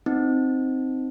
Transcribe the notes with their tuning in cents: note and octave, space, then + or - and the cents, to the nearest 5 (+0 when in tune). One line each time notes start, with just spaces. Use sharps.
C4 +0 D#4 +0